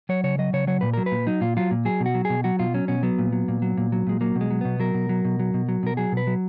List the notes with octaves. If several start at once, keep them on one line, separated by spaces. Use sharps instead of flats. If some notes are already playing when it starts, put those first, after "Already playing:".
F#3 C#5
C#3 C#5
F#3 D#5
C#3 C#5
F#3 C#5
A#2 B4
F#3 A#4
B4
A#2
F#3 D#4
A#2 F4
F#3 F4
A#2
F#3 G#4
B2
F#4
F#3
B2 G#4
F#3 F#4
B2 F4
F#3 C#4
B2 C#4
F#3 B3
A#2
F#3
A#2
F#3
A#2
F#3
A#2 G#3
F#3 A#3
B2
G#3
F#3
B2 B3
F#3 A#4
B2
F#3
B2
F#3
B2
F#3
B2 A#4
F#3 G#4
B2 B4
F#3